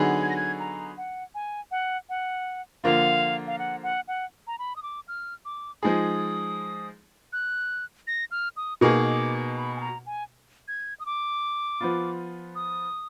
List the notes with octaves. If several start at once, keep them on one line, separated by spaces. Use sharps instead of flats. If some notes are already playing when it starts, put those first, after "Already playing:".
Already playing: D3 F#3 B3 D#4 G#4
G#6
A#6
G#6
A#5
F#5
G#5
F#5
F#5
D3 F3 A#3 F4 F5
F5
F#5
F#5
F#5
A#5
B5
D#6
D6
F6
D6
F3 G#3 D#4 G#4 D#6
F#6
A#6
F6
D#6
B2 A#3 D#4 G#4 D6
B5
G#5
A#5
G#5
G#6
D#6
D6
F3 B3 F4
D#6